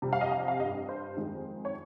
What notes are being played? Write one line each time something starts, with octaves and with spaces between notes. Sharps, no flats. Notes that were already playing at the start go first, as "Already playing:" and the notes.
F2 C3 G3
F5
D#5
F5
F5
G2 G3 D#5
C5
F2 D#3 G#3
C#5